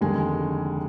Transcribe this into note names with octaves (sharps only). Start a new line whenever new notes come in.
F1 D#2 D3 G#3 G#5